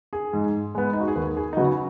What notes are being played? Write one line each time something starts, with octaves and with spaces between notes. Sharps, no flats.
G#4
G#2
G#3 B3
D#4
F#4
G#4
D#2 B4
G#4
D#4
C#3 F#3 B3 F#4